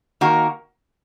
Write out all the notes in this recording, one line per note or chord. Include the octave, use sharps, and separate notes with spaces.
D#3 A#3 F#4 A#4